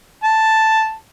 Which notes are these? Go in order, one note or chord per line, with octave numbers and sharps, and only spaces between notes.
A5